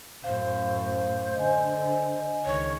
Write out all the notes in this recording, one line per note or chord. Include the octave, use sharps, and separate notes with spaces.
F#2 A2 C5 F5
D3 D#5 G#5
C#2 D#3 C#5